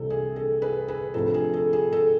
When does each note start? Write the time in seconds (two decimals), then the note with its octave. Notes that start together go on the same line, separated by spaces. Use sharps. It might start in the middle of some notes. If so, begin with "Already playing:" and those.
Already playing: C2 C3 E3 A4
0.10 G#4
0.36 A4
0.62 G#4 B4
0.88 G#4 B4
1.14 D2 C3 F3 A4
1.34 G#4
1.54 A4
1.73 G#4
1.93 A4